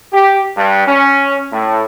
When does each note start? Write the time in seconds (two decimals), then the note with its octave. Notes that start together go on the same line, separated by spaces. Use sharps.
0.13 G4
0.57 G2
0.88 C#4
1.52 A2